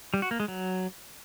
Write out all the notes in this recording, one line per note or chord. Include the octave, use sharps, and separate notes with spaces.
G3
F#4
A#3
G#3
F#3